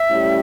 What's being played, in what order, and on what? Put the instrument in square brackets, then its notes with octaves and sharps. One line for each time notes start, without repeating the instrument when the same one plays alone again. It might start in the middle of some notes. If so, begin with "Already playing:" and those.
Already playing: [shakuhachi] E5
[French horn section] A2 G3 C#4